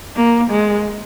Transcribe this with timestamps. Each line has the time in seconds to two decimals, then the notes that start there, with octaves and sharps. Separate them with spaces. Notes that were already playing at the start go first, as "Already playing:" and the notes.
0.16 A#3
0.51 G#3